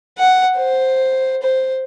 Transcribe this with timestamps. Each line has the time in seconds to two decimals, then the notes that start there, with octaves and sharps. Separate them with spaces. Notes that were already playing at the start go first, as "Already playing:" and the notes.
0.18 F#5
0.57 C5
1.43 C5